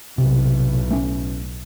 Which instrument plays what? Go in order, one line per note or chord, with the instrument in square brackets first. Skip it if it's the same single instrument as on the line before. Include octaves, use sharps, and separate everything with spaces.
[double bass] B1 A2 [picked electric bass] C3
[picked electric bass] A3 C#4